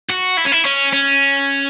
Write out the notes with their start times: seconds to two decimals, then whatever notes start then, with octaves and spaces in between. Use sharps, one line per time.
0.10 F#4
0.38 E4
0.45 C#4
0.52 E4
0.65 C#4
0.93 C#4